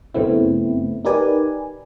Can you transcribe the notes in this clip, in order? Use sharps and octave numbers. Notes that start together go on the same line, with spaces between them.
F#2 C#3 A3 B3 C4 E4
D#4 G4 A#4 B4 D5 G#5